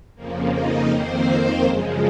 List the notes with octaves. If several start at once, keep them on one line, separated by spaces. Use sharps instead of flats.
F2 C#3 F3 A#3
D#4 D#5
F2 D#3 A#3 C4 C5
C4 C5
F#2 C#3 F3 G#3